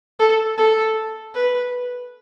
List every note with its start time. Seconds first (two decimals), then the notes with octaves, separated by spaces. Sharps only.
0.19 A4
0.57 A4
1.34 B4